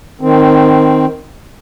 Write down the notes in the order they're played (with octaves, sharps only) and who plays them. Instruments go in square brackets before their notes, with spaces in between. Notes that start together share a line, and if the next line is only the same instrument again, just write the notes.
[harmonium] D#3 C4